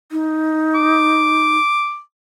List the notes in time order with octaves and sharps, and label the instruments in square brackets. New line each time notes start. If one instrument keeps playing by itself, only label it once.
[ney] D#4
[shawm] D6